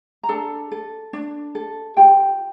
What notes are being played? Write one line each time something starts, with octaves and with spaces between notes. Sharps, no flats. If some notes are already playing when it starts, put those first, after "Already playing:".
A#5
D4 A4 A5
A4
D4
A4
F4 G4 G5